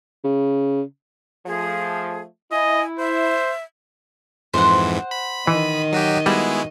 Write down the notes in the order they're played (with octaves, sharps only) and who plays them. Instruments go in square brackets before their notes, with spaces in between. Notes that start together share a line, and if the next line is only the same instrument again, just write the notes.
[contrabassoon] C#3
[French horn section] F3 A3 [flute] G#4
[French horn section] E4 [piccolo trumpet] D#5 [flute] G#5
[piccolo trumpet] C5 [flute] E5
[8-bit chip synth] F2 G#2 E3 [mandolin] C5 F#5
[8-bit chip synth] B5
[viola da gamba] D#3 D#5 [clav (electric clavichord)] E3
[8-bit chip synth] F#3 F#4 G4
[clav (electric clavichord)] G3 [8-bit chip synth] G#3 B3 E4 [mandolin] F#4 G#4